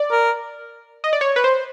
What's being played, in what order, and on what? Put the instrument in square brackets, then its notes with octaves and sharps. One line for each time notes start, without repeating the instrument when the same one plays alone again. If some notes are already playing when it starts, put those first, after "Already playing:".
Already playing: [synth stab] D5
[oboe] A#4
[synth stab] D#5
D5
C#5
B4
C5